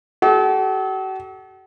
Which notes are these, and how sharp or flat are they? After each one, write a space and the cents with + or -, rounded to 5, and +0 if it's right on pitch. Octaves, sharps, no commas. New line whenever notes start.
F#4 +45 A4 -45